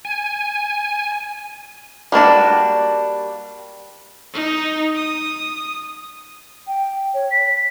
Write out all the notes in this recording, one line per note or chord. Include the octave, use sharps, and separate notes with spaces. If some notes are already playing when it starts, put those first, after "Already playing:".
G#5
G3 A#3 D4 F#4
D#4
D#6
G5
C#5
B6